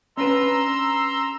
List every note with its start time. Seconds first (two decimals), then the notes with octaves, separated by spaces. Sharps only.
0.17 C#4 D4 B4 A#5 C6 E6